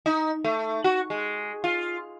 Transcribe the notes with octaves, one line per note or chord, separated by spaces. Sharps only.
D#4
A3
F#4
G#3
F4